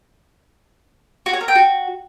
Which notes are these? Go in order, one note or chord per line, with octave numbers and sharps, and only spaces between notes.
F#4
C#5
A#4
G5
F#4